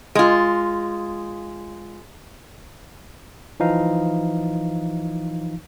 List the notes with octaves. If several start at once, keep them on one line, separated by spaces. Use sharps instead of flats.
G#3 F4
E3 F3 D#4 F5